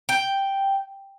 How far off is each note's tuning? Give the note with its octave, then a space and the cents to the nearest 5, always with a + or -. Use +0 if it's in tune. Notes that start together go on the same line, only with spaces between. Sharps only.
G5 +0